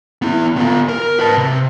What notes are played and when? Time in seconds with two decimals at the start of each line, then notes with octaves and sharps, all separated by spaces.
0.22 B3 E4
0.57 B3 F4
0.89 A#4
1.20 B4 A5
1.38 C3